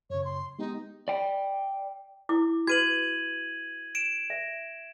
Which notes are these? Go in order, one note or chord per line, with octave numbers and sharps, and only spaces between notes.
F#2 C#3 C#5
C6
G#3 B3 D#4 G4
D5 G5
E4 D6
F#4 B4 G#6 D#7 F#7
D7 E7
E5